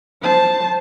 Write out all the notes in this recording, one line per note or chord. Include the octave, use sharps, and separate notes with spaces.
C5 A5